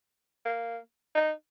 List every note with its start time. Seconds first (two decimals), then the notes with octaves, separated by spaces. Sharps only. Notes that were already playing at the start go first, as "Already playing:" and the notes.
0.45 A#3
1.15 D#4